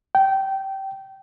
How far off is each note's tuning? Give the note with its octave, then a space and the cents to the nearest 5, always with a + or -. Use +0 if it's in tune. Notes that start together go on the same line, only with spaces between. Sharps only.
G5 -20